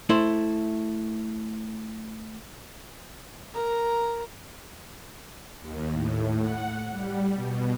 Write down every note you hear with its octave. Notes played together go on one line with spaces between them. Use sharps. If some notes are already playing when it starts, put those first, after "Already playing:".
A3 E4 C5
A#4 A#5
D#2
A2
F#5
G3
B2